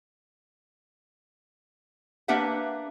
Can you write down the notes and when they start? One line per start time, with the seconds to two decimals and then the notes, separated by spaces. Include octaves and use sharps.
2.28 A#3 D4 G4 B4 E5 F#5